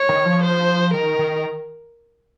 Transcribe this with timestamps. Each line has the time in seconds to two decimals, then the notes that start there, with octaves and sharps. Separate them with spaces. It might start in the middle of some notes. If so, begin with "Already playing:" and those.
Already playing: C#5
0.09 D#3
0.26 F3
0.43 C5
0.94 D#3 A#4
1.19 D#3